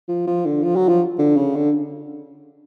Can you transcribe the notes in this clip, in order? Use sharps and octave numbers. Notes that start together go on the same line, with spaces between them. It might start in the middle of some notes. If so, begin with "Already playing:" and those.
F3
F3
D3
F3
F#3
F3
D3
C#3
D3